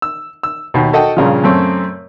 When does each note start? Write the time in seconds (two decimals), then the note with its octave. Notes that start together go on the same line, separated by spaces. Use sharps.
0.02 E6
0.43 E6
0.74 D#2 B2
0.93 F#4 A4 D#5 F#5 G5
1.17 G2 A#2 C#3 F3
1.44 F#2 A3 C4 C#4